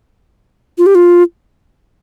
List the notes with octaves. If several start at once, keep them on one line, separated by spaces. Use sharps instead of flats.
F4
G4
F4